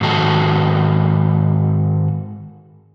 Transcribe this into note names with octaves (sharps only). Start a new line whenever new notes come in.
G#2 D#3 F#4 A4